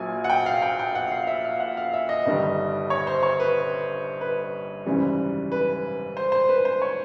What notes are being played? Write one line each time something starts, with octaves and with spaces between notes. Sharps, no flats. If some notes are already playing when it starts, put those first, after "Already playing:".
Already playing: A#1 A#2 F#3 G#5
F#5
G5
F5
G5
G5
F#5
F5
E5
F5
F#5
F5
E5
D#5
G1 G2 D#3 G3
C#5
C5
C#5
B4
B4
G#1 F#2 C#3 E3 G3
B4
C5
C5
B4
C5
C#5